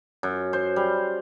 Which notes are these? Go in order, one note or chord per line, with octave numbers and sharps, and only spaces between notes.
F#2
C5
G3